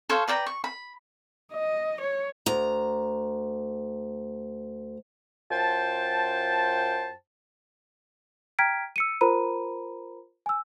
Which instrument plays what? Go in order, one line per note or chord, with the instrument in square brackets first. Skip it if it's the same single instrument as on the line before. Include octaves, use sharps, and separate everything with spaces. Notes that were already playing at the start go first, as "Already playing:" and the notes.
[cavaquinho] A4 C5 C#5 F5
B4 D5 G5 A#5
C#6
B5
[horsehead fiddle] D#5
C#5
[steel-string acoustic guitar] D2 A#5
[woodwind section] F#2 F4 C5 G5 A5
[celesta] G5 A#5 F6 G#6 B6 D7
E6 C#7 D#7
F4 A#4 C5 A#5 B5 D#7
G#5 E6